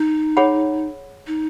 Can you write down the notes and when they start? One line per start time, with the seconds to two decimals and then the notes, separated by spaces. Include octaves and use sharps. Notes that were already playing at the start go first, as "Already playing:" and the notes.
Already playing: D#4
0.37 G#4 C#5 F#5 B5
1.27 D#4